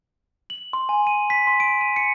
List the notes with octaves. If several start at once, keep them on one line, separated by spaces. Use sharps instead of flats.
F#7
C6
G#5
D#7
B6
C6
D7
D#7
C#7